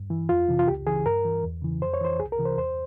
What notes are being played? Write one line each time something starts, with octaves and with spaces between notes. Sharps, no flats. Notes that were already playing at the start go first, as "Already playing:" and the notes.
Already playing: G2
E3
F2 F4
C3 E3
F4
C#2 G4
C#3 E3 G#4
G2 A#4
E3
E2
C#3 E3
F2 C5
C#5
E3 C5
C2 G#4
A#4
C3 E3
C5
E2 C5